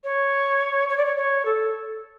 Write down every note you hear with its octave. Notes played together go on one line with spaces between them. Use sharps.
C#5
C#5
D5
C#5
C#5
A4